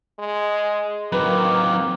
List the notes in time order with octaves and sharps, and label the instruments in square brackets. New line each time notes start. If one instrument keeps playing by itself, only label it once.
[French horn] G#3
[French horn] D#3 [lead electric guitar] F#3 C4 [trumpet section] A#3 D6 [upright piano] B4